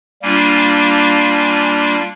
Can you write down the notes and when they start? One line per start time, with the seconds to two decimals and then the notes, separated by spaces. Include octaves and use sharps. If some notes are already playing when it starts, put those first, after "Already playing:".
0.22 G3 A#3 D4 F4 G#5
1.31 G#5